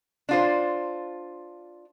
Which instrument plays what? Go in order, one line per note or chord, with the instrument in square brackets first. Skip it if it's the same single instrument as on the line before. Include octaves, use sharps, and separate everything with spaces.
[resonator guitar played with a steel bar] D4 F4 C5